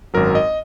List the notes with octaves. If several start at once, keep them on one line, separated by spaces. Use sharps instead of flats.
G#1 F#2 F#3 A#4
D#5